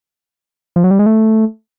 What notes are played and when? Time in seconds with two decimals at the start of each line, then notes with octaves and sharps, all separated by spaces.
0.76 F3
0.84 F#3
0.91 G3
0.99 G#3
1.06 A3